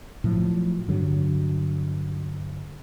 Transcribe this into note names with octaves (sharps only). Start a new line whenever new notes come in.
A2 F3 F#3
G2 D3 F#3